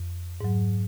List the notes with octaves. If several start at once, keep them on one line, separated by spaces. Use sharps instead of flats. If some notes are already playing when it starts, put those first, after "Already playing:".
Already playing: F2
G#2 F#3